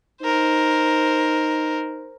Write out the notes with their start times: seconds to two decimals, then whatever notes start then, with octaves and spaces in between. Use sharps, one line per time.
0.22 D#4 A#4 C5